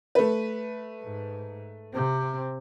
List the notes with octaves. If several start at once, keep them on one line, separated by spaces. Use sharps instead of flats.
A3 B4
G#2
C3 C4